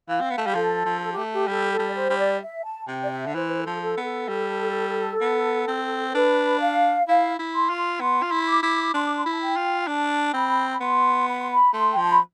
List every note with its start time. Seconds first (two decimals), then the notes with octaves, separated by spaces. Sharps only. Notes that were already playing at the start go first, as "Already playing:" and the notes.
0.09 E3 F5
0.20 C4
0.30 B3
0.38 A3
0.47 G3 G4
0.55 F3 A4
0.86 F3
1.02 A4
1.12 A3 G4
1.32 G4
1.48 G3 A4
1.72 A4
1.79 G3
1.88 D5
1.94 C5
2.10 G3
2.18 D5
2.41 E5
2.65 A5
2.88 C3 G5
3.04 D5
3.11 E5
3.26 D3
3.35 E3 C5
3.47 B4
3.58 A4
3.66 F3
3.81 A4
3.97 B3
4.04 A4
4.29 G3
5.21 B3
5.68 C4
6.07 C5
6.15 D4 B4
6.61 F5
7.07 E4 F5
7.39 E4
7.55 C6
7.70 F4
7.78 C6
8.00 B3 C6
8.22 F4
8.31 E4
8.48 D6
8.63 E4
8.94 D4 C6
9.06 D6
9.15 C6
9.24 E4 B5
9.33 A5
9.41 G5
9.57 F4
9.87 D4 A5
10.33 C4 B5
10.71 B5
10.81 B3 C6
11.28 B5
11.39 C6
11.52 B5
11.74 A3 C6
11.92 G5
11.97 F3
12.02 A5
12.11 B5